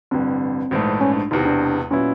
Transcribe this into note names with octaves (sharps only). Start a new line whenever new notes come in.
A1 G2 D3 C4
A#1 G#2 E3 A3
C#4
D4
E1 E2 C3 D#4
D4
A#2 F#3 B3 C#4 E4